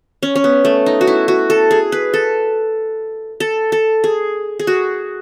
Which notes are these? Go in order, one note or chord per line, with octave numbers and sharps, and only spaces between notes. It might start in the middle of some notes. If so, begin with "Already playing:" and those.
C#4
C#4
B3
A3
D#4
F#4
E4
F#4
A4
G#4
B4
A4
A4
A4
G#4
G#4
F#4